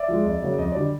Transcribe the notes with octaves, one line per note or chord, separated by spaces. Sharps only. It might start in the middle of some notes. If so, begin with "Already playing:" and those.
Already playing: D5 E5
F3 G#3
F2
C#3 F#3 A#3
F2 D#5
D3 G3 D5